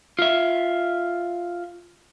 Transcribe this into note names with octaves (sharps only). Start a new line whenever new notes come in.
F4 E5